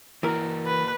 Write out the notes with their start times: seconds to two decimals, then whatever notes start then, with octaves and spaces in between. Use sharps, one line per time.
0.23 E3 A#3 F#4 A#4
0.66 B4